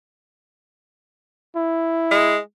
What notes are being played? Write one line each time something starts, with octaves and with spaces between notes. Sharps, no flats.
E4
G#3